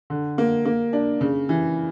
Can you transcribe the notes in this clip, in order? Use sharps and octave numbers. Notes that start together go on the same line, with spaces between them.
D3
A#3
A#3
D4
C#3
E3